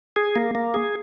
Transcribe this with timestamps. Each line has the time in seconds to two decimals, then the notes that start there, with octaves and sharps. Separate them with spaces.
0.16 G#4
0.36 A#3
0.55 A#3
0.74 G#4